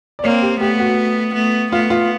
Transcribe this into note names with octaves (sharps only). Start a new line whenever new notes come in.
D5
A#3 C4 C#5
G4
A3 B3 G4
F#4
A3 B3
A3 B3 F4
F4